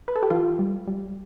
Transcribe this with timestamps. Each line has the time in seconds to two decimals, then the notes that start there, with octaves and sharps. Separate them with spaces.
0.08 B4
0.16 A4
0.23 G4
0.30 E3 F4
0.59 G3
0.88 G3